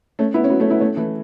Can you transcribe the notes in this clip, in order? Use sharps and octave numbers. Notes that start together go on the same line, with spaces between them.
A3 C#4
B3 E4
C#4
F#3 B3
A3 C#4
B3 E4
A3 C#4
E3 A3